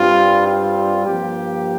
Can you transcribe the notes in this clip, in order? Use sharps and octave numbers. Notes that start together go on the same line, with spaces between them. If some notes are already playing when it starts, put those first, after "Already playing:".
Already playing: G2 G3 C4 F4
F4
G2 F3 A#3 G4